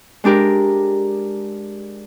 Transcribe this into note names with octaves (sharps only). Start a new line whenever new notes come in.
G#3 D4 G4 A#4